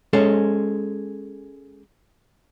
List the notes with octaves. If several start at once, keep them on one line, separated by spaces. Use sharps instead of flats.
G#3 C#4 A4 C5